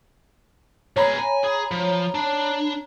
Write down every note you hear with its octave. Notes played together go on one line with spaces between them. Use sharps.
B2 G#4 C#5 A#5 B5
G#5
G#4
F3
D4